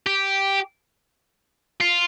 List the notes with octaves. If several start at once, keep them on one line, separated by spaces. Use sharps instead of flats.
G4
F4